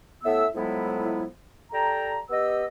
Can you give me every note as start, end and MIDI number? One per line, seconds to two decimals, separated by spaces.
0.24 0.46 45
0.24 0.46 59
0.24 0.46 76
0.24 0.46 88
0.55 1.26 45
0.55 1.26 53
0.55 1.26 54
0.55 1.26 56
0.55 1.26 59
0.55 1.26 64
1.72 2.17 55
1.72 2.17 69
1.72 2.17 79
1.72 2.17 81
1.72 2.17 82
2.30 2.65 59
2.30 2.65 67
2.30 2.65 75
2.30 2.65 88